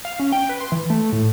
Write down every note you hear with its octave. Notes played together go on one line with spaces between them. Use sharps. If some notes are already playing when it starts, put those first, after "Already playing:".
F5
C#4
G5
B4
C6
E3
A3
A2